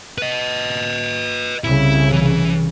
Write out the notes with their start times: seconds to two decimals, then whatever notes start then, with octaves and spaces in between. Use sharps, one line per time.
0.18 B4 D#5
1.64 C2 C#3 E4
2.12 E3